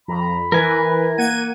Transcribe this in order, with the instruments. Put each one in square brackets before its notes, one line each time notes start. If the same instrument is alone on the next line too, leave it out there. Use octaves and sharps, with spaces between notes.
[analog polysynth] F2 [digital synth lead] A#5 [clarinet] B5
[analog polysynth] E3 [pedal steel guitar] A#4 G#5 [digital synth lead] B4
[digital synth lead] A#3 [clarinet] F#5 [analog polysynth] G#6 D#7